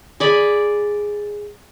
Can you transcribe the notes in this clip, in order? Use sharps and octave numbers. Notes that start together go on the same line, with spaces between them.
G#4 D5 B5